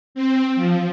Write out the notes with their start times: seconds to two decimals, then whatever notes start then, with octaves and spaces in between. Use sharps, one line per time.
0.15 C4
0.56 F3